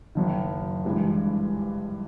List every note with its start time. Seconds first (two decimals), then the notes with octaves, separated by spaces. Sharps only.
0.15 F#1 F#2 D#3
0.85 G1 G2 E3 G#3